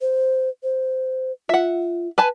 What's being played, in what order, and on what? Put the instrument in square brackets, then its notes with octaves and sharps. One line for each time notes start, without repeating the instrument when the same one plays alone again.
[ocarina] C5
C5
[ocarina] F4 [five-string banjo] E5 F#5
[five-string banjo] B4 G#5 A5